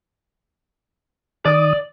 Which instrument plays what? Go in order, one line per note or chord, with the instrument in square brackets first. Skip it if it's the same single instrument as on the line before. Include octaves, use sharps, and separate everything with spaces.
[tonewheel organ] D#3 D#6 [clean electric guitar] D5